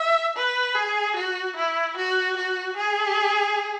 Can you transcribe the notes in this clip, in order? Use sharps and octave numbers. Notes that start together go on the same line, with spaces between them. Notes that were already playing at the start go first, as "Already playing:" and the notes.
Already playing: E5
B4
G#4
F#4
E4
F#4
F#4
G#4